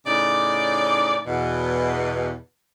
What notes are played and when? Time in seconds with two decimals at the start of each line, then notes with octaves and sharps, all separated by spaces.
0.06 A2 C#3 D#4 D5
1.26 E2 B2